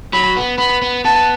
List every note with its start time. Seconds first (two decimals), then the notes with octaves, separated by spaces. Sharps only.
0.13 F#3 B5
0.36 B3
0.59 B3 B5
0.82 B3
1.05 B3 A5